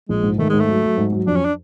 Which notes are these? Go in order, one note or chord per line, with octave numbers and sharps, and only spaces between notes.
A#1 G#3
G#2
D#3 A3
G#2 G#3
A3
F#3
F#3
G#2
F#3
F2 D4
C#4
D4